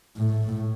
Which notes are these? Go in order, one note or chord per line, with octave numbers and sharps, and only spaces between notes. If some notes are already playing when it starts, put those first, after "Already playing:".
A2